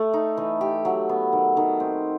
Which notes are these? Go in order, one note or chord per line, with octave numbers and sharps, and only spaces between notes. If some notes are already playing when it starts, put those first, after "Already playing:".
Already playing: A3
D#4
E3
G4
F#3
B3
D#3
D#3
C4